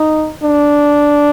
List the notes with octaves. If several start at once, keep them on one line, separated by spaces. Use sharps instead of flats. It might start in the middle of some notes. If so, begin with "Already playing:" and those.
Already playing: D#4
D4